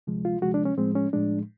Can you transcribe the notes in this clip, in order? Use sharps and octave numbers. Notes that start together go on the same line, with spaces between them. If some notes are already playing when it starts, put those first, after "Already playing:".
D2 C3 F3 G#3
F4
D2 C3 F3 G#3 F#4
D4
C#4
A2 F3 G#3 C4
C#4
A2 F3 G#3 D4